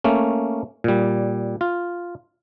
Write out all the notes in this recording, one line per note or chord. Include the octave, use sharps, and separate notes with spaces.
A3 A#3 C#4
A#2 G3
F4